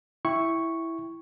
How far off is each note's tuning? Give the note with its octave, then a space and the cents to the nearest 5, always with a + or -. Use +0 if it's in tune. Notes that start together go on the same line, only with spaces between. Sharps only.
E4 +0 G5 +0 C#6 +0